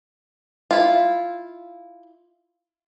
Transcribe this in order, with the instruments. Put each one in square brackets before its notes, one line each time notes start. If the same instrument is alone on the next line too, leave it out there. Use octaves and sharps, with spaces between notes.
[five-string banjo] E4 F4